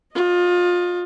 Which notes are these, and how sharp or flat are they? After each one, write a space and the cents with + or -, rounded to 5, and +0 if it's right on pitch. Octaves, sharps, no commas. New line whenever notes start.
F4 +25 D#5 -5